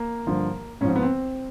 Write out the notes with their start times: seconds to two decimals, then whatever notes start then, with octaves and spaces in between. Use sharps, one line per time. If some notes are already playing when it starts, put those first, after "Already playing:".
Already playing: A#3
0.27 G2 D3 F3
0.81 G#2 C#4
0.85 F3 C4
0.96 B3
1.03 C4